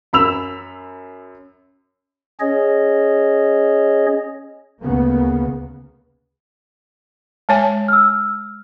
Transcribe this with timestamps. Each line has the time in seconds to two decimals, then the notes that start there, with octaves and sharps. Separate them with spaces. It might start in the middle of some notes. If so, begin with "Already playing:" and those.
0.13 F#2 B5 E6 F7
2.40 C#4 G#4 C#5 D#5
4.82 D2 C#3 A#3 B3
7.49 G#3 C#5 G#5 A5
7.88 E6 F6